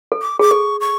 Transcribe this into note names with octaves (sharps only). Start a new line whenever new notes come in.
A4
D6
G#4 D6
A4 C#6
C#6